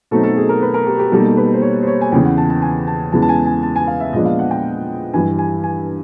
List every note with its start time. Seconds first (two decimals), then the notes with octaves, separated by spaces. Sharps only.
0.11 B2 F#3 A3 C4 D#4 A4
0.23 A4
0.36 G#4
0.49 A#4
0.62 B4
0.74 A#4
0.87 G4
0.99 G4
1.12 B2 G3 A#3 D#4 A4
1.37 B4
1.54 C5
1.62 C#5
1.83 C5
1.87 C#5
2.01 G#5
2.12 E2 C#3 E3 G5
2.25 F#5
2.37 A5
2.50 A5
2.62 G#5
2.87 A5
3.12 E2 C#3 E3 G#3 B3 A5
3.22 A5
3.29 G#5
3.46 G#5
3.63 A5
3.76 G#5
3.87 F5
4.00 E5
4.13 A#2 F3 G#3 B3 D4 D#5
4.25 F5
4.39 F#5
4.51 G5
5.14 G2 E3 G3 G#5
5.39 G#5
5.64 G#5